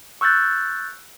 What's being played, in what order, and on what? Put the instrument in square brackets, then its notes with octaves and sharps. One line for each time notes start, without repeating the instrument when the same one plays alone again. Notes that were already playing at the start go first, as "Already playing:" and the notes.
[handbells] C#6 E6 F#6 G6 A6